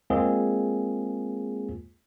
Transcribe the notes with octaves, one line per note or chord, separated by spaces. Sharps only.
G#3 A#3 C4 F4 G#4